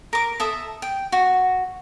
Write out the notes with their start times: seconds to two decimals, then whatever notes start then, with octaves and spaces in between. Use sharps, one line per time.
0.13 A#4 D6
0.40 A4 E5 D#6
0.82 G5
1.12 F#4